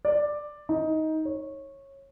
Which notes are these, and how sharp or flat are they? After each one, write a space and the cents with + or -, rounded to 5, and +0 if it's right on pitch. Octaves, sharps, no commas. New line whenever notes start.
D5 +10
D#4 +15
C#5 -15